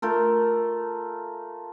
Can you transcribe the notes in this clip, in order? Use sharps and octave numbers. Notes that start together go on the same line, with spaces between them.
A3 F4 A#4